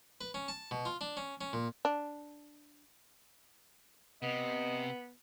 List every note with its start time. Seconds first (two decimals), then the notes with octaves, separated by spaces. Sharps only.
0.21 B4
0.34 C#4
0.48 A5
0.71 B2
0.85 F4
1.01 D4
1.17 C#4
1.41 C#4
1.53 A#2
1.85 D4
4.23 C3 B3 D#5